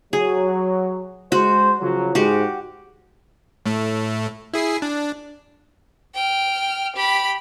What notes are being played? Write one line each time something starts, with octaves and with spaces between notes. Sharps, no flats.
F#3 G#4
G#3 F#4 C5
C#3 F3 F#3
G#2 G#3 F#4 G4
A2 A3
E4 G#4 C7
D4
G5 F6
G4 B5